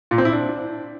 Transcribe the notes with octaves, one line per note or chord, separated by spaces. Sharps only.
A#2
C4
E4
D4